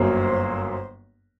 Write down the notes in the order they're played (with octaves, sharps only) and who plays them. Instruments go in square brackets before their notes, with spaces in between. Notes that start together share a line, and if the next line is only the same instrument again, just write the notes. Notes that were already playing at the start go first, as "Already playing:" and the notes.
Already playing: [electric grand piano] G1 F#2 F#3 A#3 [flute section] C5